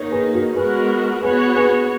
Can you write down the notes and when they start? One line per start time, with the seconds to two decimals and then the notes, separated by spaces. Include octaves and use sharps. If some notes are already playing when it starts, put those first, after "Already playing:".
Already playing: D#3 A#3 D#4 A#4 C#5
0.11 G#4 B4
0.33 F#4 A#4
0.55 G#3 B3 F#4 G#4 A#4 B4
1.22 B3 F#4 G#4 B4 C#5
1.56 G#4 B4